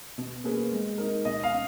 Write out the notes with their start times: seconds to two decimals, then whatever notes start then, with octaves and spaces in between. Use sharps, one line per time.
0.18 B2
0.44 A#3 C#4 G#4 B4
0.71 G#3
0.98 D#4 A#4
1.25 B2 D#5
1.43 F5
1.53 C#4